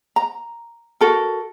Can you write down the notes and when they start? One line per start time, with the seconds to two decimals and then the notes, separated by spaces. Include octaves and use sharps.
0.16 A#5
1.01 F#4 A4 A#4